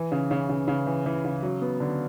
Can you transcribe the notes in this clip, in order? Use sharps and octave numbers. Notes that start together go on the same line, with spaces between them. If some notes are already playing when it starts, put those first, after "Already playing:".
Already playing: E3
C#3
C#3
C#3
C#3
E3
E3
C#3
F#3
B3
D3